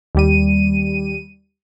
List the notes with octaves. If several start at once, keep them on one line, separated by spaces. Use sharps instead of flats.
D#2 G3 D#7